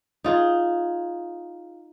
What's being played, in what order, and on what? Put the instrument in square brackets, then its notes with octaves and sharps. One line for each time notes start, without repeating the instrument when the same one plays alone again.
[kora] D#4 F4 G#4